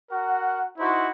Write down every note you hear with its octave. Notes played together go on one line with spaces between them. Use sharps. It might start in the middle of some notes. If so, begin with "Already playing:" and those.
F#4 A#4 F#5
D#4 E4 F#4 C5